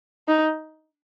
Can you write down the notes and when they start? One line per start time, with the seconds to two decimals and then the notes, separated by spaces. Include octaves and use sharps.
0.28 D#4